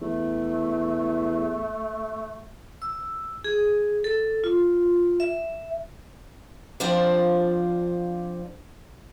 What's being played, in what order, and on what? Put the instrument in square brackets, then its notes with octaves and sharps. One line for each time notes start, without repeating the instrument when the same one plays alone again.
[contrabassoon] E2 [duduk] A3
[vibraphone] E6
G#4
A4
F4
E5
[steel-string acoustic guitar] F3 C4 D4 F4 C5 D5